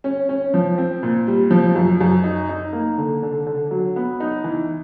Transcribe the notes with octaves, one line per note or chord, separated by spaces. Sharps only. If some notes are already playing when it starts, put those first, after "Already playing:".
C#4
C#4
F3
C4
A#2
G3
F3
F#2
F#2
D#4
D#4
A#3
D3
D3
D3
F#3
B3
D#4
E3